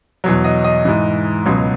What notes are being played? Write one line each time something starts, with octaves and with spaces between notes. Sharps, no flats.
E2 B2 F#3
D#5
D#5
G#2 E3
C#2 B2 F#3